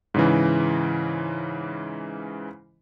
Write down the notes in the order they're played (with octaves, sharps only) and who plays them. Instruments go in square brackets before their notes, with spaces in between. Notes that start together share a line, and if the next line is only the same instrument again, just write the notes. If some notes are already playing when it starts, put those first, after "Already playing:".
[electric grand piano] G#2 C#3 E3